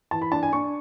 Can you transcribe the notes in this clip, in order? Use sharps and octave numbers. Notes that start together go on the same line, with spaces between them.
E3 A5
B5
D4 A5
G#5
D4 C#6